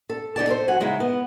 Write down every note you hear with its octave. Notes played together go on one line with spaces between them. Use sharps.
A4
G3 D#4 D5 A5
A4 A#4 C5
F#3 F#5 G#5
C#3 G#3 D#4 E4
B3